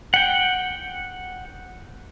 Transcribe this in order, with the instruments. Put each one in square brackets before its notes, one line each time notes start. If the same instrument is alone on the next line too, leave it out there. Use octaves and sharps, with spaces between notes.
[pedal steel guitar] F#5 G5